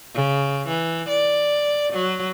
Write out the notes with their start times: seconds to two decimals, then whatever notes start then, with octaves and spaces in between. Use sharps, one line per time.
0.15 C#3
0.68 E3
1.09 D5
1.93 F#3